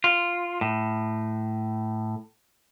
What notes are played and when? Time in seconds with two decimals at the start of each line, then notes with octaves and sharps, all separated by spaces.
0.04 F4
0.61 A2